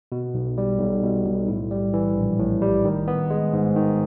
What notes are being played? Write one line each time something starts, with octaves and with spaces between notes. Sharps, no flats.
B2
B1
G3
B1
B2
B1
A2
G3
E3
A#1
A2
G3
D#3
B3
G#3
G#2
D#3